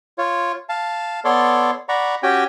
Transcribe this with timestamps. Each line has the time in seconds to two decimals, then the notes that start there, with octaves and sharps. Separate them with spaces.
0.18 F4 C#5
0.69 F5 A5
1.25 B3 A4 C#5 D5 C6
1.89 D5 F#5 A#5 B5 C#6
2.23 C#4 F#4 G4 G5 G#5